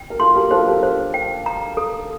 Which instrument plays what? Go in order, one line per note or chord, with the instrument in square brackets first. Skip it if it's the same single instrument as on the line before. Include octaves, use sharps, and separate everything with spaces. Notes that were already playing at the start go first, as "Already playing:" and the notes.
Already playing: [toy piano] G5
[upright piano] A#4
[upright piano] F4 A4 [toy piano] C6
[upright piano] G4 A#4
[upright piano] F4 A4 [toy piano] C5
[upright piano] G4 A#4
[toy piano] C5
G5
A#5
A4